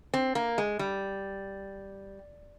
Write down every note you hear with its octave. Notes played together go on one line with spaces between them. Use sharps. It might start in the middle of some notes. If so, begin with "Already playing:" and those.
C4
A#3
G#3
G3